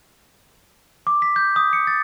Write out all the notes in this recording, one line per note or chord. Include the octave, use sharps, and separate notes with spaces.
D6
B6
G6
D#6
C#7
A6